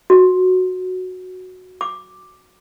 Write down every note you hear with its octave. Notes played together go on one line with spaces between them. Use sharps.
F#4
D6